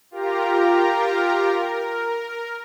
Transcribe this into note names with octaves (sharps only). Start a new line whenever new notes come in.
F4 G4 A#4 A#5
A#4